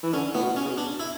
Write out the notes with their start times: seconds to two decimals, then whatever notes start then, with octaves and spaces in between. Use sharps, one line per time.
0.03 E3
0.13 D3 C#4
0.34 A2 B3
0.42 B2
0.56 C#4
0.65 C#3
0.70 B2
0.78 D4
0.99 E4